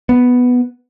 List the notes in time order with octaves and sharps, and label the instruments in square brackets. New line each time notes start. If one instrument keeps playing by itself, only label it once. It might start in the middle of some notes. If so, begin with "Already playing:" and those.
[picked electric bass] B3